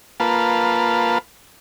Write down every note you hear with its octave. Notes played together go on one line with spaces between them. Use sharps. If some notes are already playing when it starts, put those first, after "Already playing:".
A#3 F4 B4 A5